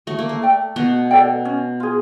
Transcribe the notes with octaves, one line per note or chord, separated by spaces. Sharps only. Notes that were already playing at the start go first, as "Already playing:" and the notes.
A3 F#4
A#3
A3
A4 D5 G5
B2 B3 F#4
A4 D5 G5
C#4
F4 G#4